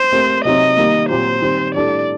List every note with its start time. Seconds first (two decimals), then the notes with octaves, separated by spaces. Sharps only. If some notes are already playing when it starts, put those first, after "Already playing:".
Already playing: C5
0.12 A3 C4 G4 A#4
0.44 C3 F#3 C4 D#4 D#5
0.77 D#3 G3 A#3
1.09 A#2 F#3 C4 G4 C5
1.42 D#3 G3 C4
1.74 A2 G3 D4 A4 D5